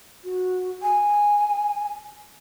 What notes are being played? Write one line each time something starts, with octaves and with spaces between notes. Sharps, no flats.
F#4
G#5